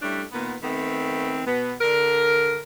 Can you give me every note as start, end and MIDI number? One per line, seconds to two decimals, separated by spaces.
0.02 0.23 55
0.02 0.23 57
0.02 0.23 61
0.02 0.23 62
0.02 0.23 64
0.32 0.55 46
0.32 0.55 51
0.32 0.55 59
0.62 1.41 51
0.62 1.41 57
0.62 1.41 59
0.62 1.41 60
1.47 1.73 47
1.47 1.73 59
1.81 2.59 50
1.81 2.59 70